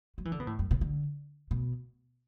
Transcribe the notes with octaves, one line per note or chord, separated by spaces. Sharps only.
F#3
E3
D3
B2
A2
F#2
B2
D3
B2